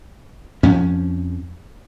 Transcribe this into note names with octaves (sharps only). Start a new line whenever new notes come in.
F2 F3 C#4